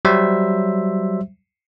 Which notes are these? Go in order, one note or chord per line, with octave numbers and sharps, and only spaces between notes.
F#3 G3 C5 E5